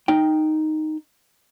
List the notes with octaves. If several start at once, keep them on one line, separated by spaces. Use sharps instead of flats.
D#4 G5